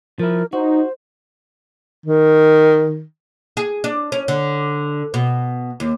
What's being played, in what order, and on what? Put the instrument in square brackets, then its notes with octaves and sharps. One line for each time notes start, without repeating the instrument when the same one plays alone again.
[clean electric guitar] F3 E4 [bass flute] A#4
[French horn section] D#4 [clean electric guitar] F#4 [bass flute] C5
[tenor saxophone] D#3
[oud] G#4
D4
C#4
D3
B2
D#2